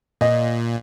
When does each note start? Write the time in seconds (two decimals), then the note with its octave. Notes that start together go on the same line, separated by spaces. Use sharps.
0.21 A#2 D#5